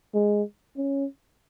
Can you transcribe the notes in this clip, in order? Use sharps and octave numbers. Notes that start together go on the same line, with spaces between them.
G#3
C#4